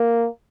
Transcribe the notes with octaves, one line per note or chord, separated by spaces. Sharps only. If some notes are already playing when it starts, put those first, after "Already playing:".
Already playing: A#3